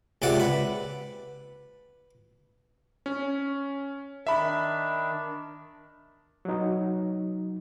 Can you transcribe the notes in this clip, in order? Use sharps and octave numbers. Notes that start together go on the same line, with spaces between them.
C#2 C3 D5 F#5
B4
C#4
D#3 D4 E5 B5
F#3 D#4